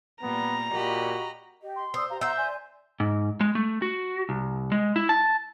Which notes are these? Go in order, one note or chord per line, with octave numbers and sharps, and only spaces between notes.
A#2 G3 B3 A#5
A#2 F#4 G4 D#5 B5
G4 D#5
C6
C5 D5 D#6 E6
G4 F5 A#5
C5 E5 F#5 A#5 C6 G6
D5 G#5 C6
G#2
G#3
A3
F#4
C2
G#3
E4
A5